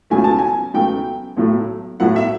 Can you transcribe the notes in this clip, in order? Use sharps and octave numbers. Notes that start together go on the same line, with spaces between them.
C#2 B2 F#3 A3 G#5
A5
G#5
C#2 B2 F#3 A3 G5
B1 A2 F#3 A3
B1 A2 F#3 A3 F#5
E5